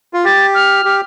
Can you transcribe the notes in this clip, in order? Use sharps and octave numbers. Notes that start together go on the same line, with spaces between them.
F4
G4 A6
F6
G4